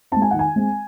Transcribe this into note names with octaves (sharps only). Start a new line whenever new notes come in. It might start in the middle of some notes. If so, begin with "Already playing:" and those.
G#3 C4 A5
G#5
D#3 F#5
G#5
G#3 C4